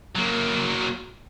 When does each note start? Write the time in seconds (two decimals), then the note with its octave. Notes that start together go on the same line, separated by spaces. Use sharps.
0.15 F#3 A#3